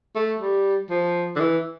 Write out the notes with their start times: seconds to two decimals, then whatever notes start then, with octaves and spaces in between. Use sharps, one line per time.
0.15 A3
0.40 G3
0.90 F3
1.36 D3
1.40 E3